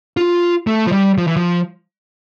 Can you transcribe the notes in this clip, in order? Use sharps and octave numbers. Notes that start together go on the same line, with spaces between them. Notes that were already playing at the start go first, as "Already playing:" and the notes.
F4
A3
F3
G3
F3
E3
F3